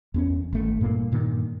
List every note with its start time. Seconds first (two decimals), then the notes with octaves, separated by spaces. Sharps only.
0.14 E2 C4 C#4
0.53 G#1 A3
0.81 G2 A#2 A#3
1.12 G2 A#2 D#3